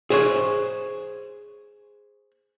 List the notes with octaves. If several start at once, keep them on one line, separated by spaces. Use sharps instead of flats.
G#4 C5 C#5